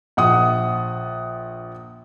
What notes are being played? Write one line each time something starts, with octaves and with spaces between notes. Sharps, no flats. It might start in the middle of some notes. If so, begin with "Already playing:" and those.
A#1 F#5 D#6